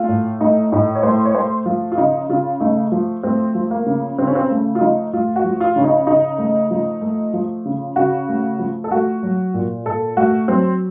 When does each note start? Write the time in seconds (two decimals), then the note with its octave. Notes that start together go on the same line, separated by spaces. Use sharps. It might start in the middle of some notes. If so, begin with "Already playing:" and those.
Already playing: A3 F4
0.08 A2
0.40 A3 D#4
0.72 A2 D#4
0.95 C#5
1.03 A3 C5
1.25 C#5
1.34 A3 C5
1.66 F3 F4
1.92 F4
1.97 C#3 D#4
2.29 C#3 F4
2.60 A3 D#4
2.92 F3
3.23 A3 C4
3.55 F3
3.71 A#3
3.86 C#3
4.18 C#3 C4
4.27 C#4
4.35 C4
4.50 A3
4.75 F4
4.81 F3 D#4
5.13 A3 F4
5.36 F#4
5.44 F3
5.60 F4
5.76 C#3 C#4
5.84 D#4
6.07 C#3 D#4
6.38 A3
6.71 F3
7.01 A3
7.33 F3
7.65 C#3
7.96 C#3 F#4
8.28 A3
8.59 F3
8.84 A4
8.91 A3 F#4
9.23 F#3
9.54 A#2
9.86 A#2 A4
10.17 A3 F#4
10.48 F#3 C4